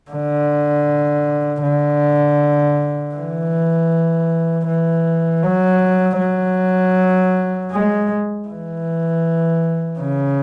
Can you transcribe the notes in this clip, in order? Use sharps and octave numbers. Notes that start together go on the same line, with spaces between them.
D3
D3
E3
E3
F#3
F#3
G#3
E3
C#3